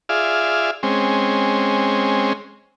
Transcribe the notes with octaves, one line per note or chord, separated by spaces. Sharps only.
F4 G#4 D5 E5 F5
G#3 C4 C#4